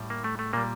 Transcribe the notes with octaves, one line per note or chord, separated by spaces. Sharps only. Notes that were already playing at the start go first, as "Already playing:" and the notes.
Already playing: A2 G3
A#3
A3
A3
A#2 G3 A#3